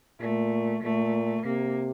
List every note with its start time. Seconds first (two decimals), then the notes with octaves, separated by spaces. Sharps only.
0.20 A#2 A3
0.82 A#2 A3
1.46 C3 A#3